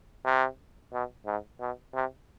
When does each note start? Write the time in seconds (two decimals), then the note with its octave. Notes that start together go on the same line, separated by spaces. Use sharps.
0.25 C3
0.93 B2
1.26 G#2
1.60 B2
1.94 C3